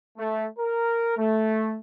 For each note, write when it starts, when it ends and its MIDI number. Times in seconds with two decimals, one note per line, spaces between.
0.17 0.47 57
0.58 1.16 70
1.17 1.76 57